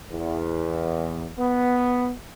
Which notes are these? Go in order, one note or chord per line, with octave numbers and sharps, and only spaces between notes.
E2
B3